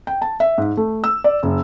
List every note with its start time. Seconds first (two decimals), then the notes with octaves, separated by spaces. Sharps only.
0.07 G5
0.22 A5
0.40 E5
0.58 G#2
0.77 A3
1.04 E6
1.24 D5
1.43 F#1